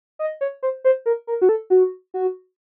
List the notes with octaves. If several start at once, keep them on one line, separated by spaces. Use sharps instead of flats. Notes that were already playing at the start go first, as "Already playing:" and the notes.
D#5
C#5
C5
C5
A#4
A#4
F#4
A4
F#4
F#4